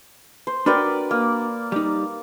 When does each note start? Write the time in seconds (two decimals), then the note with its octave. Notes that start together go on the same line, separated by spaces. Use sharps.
0.47 C5
0.66 D4 F#4 A#4 B4 D5 G5
1.11 A#3
1.72 G3 D#4 D6